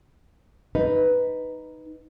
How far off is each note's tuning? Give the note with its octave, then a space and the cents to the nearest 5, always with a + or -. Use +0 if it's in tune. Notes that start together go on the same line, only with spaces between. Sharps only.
D#4 +0 B4 +0